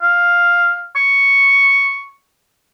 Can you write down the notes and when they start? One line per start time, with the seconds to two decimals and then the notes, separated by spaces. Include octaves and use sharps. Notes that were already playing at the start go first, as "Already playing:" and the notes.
0.02 F5
0.96 C#6